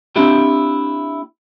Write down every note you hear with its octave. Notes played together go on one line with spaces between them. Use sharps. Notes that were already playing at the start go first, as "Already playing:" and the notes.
A#3 C4 D4 E4 G4